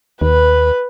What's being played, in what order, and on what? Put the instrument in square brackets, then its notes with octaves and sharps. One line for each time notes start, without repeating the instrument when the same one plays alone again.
[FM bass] D#2 [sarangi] B4